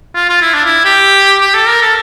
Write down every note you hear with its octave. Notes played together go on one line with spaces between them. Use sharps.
F4
F4
E4
D4
E4
G4
G4
A4
A#4
A4